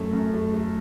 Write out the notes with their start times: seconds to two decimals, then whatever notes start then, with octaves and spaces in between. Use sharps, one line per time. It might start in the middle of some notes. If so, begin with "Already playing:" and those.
Already playing: F#2 A3
0.13 F#2
0.34 A3
0.54 A3